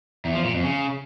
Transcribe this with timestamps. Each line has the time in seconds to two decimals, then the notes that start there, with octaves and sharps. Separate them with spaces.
0.25 E2
0.35 F3
0.44 A#2
0.54 F2
0.64 C#3